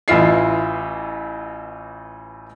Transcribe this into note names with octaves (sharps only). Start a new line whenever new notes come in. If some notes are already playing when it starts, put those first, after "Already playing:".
A1 E3 E4 F4 E5 C7